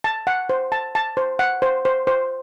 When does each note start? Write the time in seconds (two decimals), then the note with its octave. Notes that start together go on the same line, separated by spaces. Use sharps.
0.04 A5
0.27 F#5
0.50 C5
0.72 A5
0.95 A5
1.17 C5
1.39 F#5
1.62 C5
1.85 C5
2.07 C5